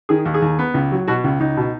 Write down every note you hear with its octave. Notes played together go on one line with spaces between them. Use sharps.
D#3 G#4
D#2
G#4
D#2
B3
C#2
F#3
B2 F#4
C#2
C#2 D#4
B2